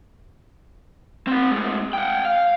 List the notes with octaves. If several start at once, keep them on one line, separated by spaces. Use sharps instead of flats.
C4 F#5
A2 G#3
F#5 G5
F5